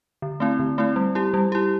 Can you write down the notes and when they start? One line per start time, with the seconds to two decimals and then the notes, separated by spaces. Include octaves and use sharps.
0.22 D3
0.40 A3 C4 E4
0.59 D3
0.78 A3 C4 E4
0.96 G3
1.15 E4 G4
1.34 G3
1.52 E4 G4